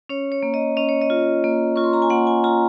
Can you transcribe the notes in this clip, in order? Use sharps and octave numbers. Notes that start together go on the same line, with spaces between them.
C#4 C#5
C#5
A#3
D#5
C#4 D#5
C#5
D#5
F4
A#3
F4 C#6
C6
A#5
G#5
A#3 F#5
G#5
F4 A#5